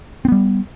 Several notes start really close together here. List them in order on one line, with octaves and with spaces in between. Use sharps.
C4 B3 G3